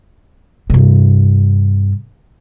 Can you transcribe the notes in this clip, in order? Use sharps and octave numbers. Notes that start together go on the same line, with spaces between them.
G2 C3